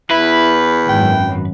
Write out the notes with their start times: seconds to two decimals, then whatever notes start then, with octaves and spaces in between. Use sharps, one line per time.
0.11 E2 E4 B4
0.89 G#1 F#2 G5